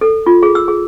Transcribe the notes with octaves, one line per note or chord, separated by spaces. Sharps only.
A4
F4
G#4
E6
G#4